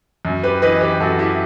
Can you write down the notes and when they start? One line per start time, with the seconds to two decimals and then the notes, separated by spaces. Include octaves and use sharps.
0.25 F#2
0.43 G4 B4
0.62 E3 B4 D#5
0.81 G4 B4
1.00 F#2 F#4 A4
1.19 E4 G4